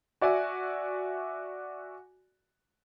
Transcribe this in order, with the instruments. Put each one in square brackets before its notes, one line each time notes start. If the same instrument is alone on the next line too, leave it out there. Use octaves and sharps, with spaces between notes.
[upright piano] F#4 D5 E5 G#5